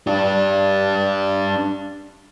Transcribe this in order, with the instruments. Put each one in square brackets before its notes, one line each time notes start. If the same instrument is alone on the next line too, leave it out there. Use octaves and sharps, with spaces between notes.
[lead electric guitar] D4 G4